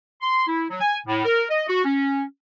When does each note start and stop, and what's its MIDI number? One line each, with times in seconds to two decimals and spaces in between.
0.21 0.47 84
0.47 0.64 64
0.69 0.77 54
0.81 0.97 80
1.07 1.22 45
1.24 1.43 70
1.49 1.67 75
1.68 1.83 66
1.84 2.23 61